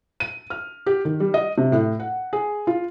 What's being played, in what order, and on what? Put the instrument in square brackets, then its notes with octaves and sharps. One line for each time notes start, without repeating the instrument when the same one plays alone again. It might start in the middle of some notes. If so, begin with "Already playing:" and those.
[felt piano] D#7
F6
G4
D#3
G3
D#5
C3
A2
F#5
G#4
F4